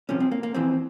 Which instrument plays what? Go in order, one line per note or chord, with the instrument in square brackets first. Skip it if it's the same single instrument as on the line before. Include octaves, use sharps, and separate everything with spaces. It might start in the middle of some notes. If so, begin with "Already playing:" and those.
[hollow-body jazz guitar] C2 C3 F3 C#4
C4
A#3
A#3
F2 E3 C4